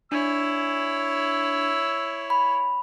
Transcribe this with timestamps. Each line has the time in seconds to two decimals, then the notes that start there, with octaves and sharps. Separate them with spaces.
0.12 D4 E4 C#5 E6
2.30 B5